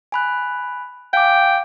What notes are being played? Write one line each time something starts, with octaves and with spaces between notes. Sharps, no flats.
G#5 B5 F#6
F5 G5 G#5 D6